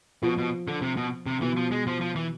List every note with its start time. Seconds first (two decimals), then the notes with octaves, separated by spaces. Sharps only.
0.22 B2 F3
0.38 B2
0.68 D3
0.82 C3
0.97 B2
1.27 C3
1.41 B2 E3
1.56 F3
1.71 G#3
1.87 F3
2.01 F3
2.16 E3